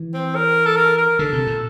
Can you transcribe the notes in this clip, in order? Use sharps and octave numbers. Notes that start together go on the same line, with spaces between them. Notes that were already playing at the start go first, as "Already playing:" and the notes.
Already playing: E3
C4
A#4
A4
A#4
A#4
D3 A4
C3
A#2